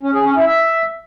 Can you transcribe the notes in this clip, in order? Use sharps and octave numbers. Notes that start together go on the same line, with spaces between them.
C#4
G#4
C#4
E4
E5